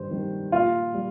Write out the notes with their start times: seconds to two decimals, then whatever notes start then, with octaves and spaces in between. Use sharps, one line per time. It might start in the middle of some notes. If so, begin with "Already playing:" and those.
Already playing: G2 D#3 G3 C5
0.11 D#3 G3
0.52 A#2 F4
0.94 G3